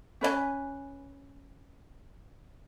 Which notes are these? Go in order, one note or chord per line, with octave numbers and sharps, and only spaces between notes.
C#4 B4 D5 G#5